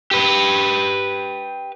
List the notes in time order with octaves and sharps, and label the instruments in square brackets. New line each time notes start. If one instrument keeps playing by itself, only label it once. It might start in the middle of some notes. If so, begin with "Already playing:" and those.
[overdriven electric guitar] G4 B4